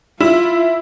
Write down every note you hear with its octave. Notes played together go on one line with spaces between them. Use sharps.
E4 F4